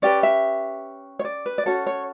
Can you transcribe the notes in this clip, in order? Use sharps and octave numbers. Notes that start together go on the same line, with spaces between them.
C#4 G4 B4 D5
E5
C#5
D5
B4
D5
C#4 F#4 A4 C#5
C#5